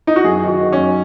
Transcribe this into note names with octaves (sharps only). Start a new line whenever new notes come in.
D#4
F#4
F#2 G#4
D#3 F#4
D#3
C#4
F#2